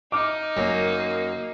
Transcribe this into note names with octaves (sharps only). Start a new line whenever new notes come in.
D#4 D6 F6
F#2 A#3